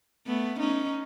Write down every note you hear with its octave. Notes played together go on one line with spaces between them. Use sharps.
A3 B3
C#4 D#4